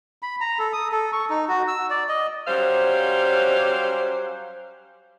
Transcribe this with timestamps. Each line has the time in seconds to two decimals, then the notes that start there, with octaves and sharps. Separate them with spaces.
0.22 B5
0.41 A#5
0.59 A4
0.73 D#6
0.92 A4
1.13 C#6
1.30 D#4
1.48 F#4
1.68 E6
1.90 D5
2.09 D#5
2.46 F#3 G3 C#4 C5 F5